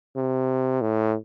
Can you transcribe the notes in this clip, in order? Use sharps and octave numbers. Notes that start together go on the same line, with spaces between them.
C3
A2